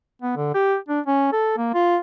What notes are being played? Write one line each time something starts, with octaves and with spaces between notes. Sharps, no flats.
B3
D3
G4
D4
C#4
A4
A#3
F4